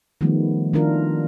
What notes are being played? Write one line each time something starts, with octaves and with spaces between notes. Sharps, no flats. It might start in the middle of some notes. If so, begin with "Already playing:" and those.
D#3 F3 G3 A3 B3
D#3 D4 E4 F4 A#4